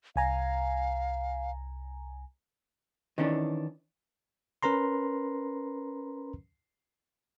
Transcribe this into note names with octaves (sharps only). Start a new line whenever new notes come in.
C2 F5 G#5 A#5
D#3 E3 C#4 D4
C#4 A#4 B4 A#5 C6